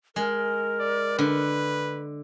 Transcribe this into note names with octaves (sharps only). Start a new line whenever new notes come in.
G#3 A#4
D5
D3 B4